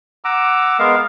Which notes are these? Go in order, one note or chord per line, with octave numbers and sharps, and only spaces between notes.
F#5 A#5 D6 E6
G#3 B3 A#4 F5